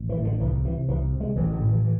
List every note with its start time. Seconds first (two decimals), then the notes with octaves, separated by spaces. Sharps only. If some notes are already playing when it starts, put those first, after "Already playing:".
Already playing: A1
0.09 E3
0.17 A2
0.24 D3
0.40 C2 E3
0.65 C3 E3
0.89 C2 E3
1.13 C3
1.20 G#3
1.36 A1 E3
1.52 D3
1.60 A2
1.69 E3
1.84 E3